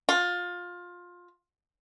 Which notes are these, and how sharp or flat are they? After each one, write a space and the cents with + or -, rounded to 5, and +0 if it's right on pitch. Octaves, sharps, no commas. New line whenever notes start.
F4 +20